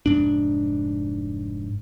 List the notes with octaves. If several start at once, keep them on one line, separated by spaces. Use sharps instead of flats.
F1 G#2 D4